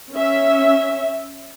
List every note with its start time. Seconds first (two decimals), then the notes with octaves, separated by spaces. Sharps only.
0.14 C#4 E5